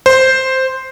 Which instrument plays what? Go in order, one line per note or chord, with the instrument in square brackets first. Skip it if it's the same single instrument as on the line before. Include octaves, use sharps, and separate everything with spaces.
[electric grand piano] C5